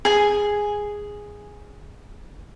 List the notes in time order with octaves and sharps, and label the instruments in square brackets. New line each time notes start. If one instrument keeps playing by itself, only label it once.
[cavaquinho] G#4 G#5